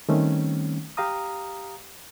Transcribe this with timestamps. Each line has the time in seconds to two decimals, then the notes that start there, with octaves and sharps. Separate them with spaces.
0.09 D#3 G3 A3 C4 C#4
0.97 G4 F5 A#5 D#6